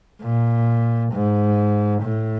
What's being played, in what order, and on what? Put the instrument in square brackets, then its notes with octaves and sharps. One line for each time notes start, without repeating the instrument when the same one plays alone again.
[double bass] A#2
G#2
A2